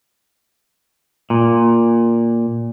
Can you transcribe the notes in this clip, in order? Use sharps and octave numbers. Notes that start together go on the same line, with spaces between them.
A#2